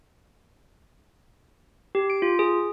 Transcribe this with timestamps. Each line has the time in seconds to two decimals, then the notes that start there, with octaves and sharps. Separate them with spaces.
1.95 G4
2.10 D7
2.22 F4
2.39 G#4